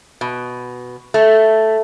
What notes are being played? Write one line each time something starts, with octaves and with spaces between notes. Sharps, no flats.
B2
A3